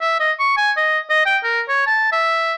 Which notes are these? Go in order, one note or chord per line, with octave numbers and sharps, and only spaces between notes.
E5
D#5
C#6
G#5
D#5
D#5
G5
A#4
C#5
A5
E5